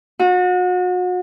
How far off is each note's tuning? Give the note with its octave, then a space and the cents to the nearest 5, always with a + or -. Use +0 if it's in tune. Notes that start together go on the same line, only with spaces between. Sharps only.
F#4 -35